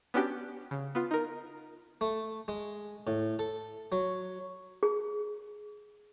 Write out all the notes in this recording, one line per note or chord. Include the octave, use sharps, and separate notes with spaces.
B3 C#4 D4 F#4 G4
C#3
B3 F4
D#4 A#4
A3
G#3
A2
A4
F#3
G#4